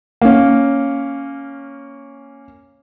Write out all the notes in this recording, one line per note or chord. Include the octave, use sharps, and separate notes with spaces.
A#3 C#4